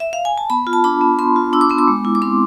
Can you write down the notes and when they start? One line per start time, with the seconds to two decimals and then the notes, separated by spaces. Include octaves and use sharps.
0.00 E5
0.13 F5
0.25 G#5
0.38 A5
0.50 B3 B5
0.67 F4
0.73 A5
0.84 D4 B5
1.01 B3
1.19 B3 C6
1.36 F4
1.53 D4 E6
1.61 D6
1.70 B3 C6
1.78 D6
1.88 G#3
2.05 E4
2.15 D6
2.22 C4 C6